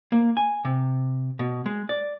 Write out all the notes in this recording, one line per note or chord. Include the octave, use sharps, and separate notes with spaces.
A#3
G#5
C3
B2
G#3
D5